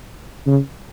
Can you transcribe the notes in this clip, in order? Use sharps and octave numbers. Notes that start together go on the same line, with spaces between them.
C#3